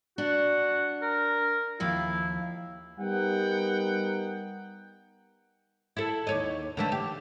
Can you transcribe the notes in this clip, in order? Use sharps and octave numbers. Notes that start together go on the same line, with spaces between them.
D4 F#4
A#4
D#2 F3 E4 F5
G3 B3 D#4 A#4 F#5 G5
E4 A4
D#2 C#5 D#5
D3 E3 A3
G4